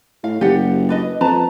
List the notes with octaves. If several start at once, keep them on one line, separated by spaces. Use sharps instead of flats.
A2 F5
F#1 G4 D5 F#5
D4 B4 D#5
F2 B4 A5 A#5